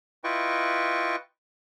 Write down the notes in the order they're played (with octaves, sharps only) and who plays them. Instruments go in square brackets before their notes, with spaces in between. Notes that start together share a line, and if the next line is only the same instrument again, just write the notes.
[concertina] E4 F4 B4 D#5 G5 C#6